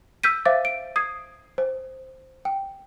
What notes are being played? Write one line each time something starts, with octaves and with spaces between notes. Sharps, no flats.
E6 F6 G6 B6 D#7
C5 E5 F5 D6 A6
D7
D#6 G#6 C7
C5
G5